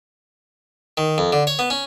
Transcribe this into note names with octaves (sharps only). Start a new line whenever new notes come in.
D#3
F2
D3
C#5
B3
C#4